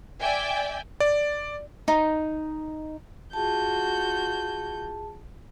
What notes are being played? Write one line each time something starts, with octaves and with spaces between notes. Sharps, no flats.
D5 E5 G5 G#5
D5
D#4
F4 F#4 G#4 A5 G6